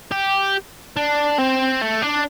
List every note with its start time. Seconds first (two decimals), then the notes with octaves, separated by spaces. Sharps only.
0.12 G4
0.97 D4
1.38 C4
1.81 A3
2.02 D4